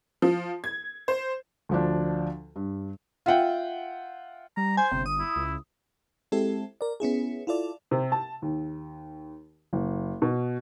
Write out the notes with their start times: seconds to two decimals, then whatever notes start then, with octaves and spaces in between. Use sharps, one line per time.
0.22 F3
0.64 G#6
1.08 C5
1.69 D2 F3 D4
2.56 G2
3.26 F4 E5 F#5 G5
4.57 G3 A#5
4.77 C5 G#5
4.92 G1 C3
5.06 D#6
5.19 E4
5.36 C#2
6.32 G#3 C4 E4 G4 A4
6.81 A#4 D5
7.00 B3 C#4 E4 G#4
7.47 E4 F4 A4 D5
7.91 C3
8.12 A5
8.42 D#2
9.73 F#1
10.22 B2